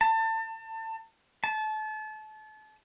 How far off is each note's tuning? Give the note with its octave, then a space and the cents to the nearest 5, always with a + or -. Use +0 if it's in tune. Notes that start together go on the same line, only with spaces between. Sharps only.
A5 +30
A5 -30